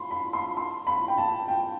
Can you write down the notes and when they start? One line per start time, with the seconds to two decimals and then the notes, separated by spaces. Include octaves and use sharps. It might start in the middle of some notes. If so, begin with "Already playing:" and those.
Already playing: B5 C6
0.11 B5
0.33 C6
0.57 C6
0.87 B5
1.08 G5
1.18 A5
1.48 G5